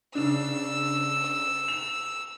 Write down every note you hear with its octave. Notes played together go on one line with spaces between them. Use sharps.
C#3 D4 E6
F7